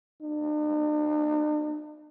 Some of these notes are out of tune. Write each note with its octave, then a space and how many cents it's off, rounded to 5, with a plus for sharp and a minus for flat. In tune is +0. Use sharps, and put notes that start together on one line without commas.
D4 +45